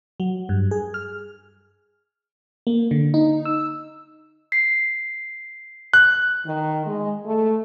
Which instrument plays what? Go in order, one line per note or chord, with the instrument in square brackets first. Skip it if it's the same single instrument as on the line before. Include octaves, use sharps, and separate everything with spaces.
[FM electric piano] F#3
G2
G#4
F6
A#3
D3
D#4
E6
[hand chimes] B6 C7
[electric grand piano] F#6
[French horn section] D#3
G#3
A3